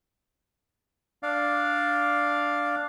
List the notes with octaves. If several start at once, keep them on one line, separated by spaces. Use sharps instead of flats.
D4 D5 F5